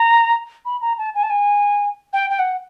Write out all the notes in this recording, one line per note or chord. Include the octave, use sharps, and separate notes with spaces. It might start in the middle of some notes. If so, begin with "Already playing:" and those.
Already playing: A#5
B5
A#5
A5
G#5
A5
G#5
G5
G5
F#5